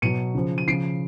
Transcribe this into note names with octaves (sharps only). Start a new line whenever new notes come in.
B2 F#3 C#7 D#7
C#3 F3
D#7
C#3 F3 C7 D7